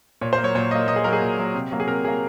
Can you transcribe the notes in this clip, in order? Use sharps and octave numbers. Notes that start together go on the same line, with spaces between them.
A#2 C#5
C5
A#3
F#3 C#5
A#2 C#5
F#3 A#3 D#5
A#2 D#5
G#4
F#3 A#3 A#4
G#4
A#2
F#3 A#3
C3
F#3 A#3
G#4
C3 A#4
F#3 A#3 G#4